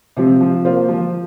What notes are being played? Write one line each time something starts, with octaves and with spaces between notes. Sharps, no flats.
C3 F3 C4
F3
A#3 F4 C5
F3